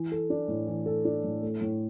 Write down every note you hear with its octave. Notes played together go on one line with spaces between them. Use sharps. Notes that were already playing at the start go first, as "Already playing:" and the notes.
Already playing: E3
A4
D4
A2
E3
A4
D4
A2
A3
A2